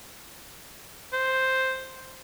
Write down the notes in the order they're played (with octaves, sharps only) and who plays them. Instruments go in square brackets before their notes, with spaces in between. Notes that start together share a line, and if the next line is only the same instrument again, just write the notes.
[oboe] C5